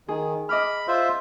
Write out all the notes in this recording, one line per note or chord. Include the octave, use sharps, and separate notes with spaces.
D#3 G#4
D#5 B5 D6 F6
F4 C5 E5